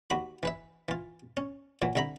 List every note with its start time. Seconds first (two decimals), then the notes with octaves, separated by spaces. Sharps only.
0.10 D#2 F#4 B5
0.43 E3 B4 E5
0.89 E3 F4
1.37 C#4
1.82 A#2 E3 F#3
1.96 C2 D3 E5 A#5 B5